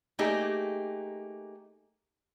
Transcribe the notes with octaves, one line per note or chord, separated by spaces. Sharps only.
A3 A#3 D#4 G4 G#4